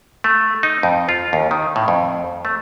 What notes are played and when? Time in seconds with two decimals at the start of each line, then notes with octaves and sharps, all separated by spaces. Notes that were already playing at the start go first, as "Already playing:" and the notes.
0.24 A3
0.63 D#4
0.83 F2
1.09 F4
1.33 D#2
1.51 D#3
1.76 A2
1.88 F2
2.45 A3